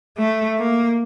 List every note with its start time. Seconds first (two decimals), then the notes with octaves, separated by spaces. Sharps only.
0.18 A3
0.58 A#3